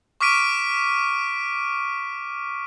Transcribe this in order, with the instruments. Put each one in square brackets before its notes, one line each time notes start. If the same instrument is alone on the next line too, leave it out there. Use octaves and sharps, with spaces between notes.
[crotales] C#6 D6 F6 B6 D7 D#7